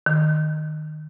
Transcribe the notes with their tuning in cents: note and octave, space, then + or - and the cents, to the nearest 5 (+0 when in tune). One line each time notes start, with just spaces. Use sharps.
D#3 -20